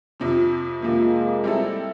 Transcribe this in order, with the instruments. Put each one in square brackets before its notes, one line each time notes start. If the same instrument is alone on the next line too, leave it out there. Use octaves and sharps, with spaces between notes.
[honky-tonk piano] F2 C3 F3
[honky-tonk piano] F2 C3 F3 [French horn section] G#3 A#3
[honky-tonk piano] G3 C4 E4 A4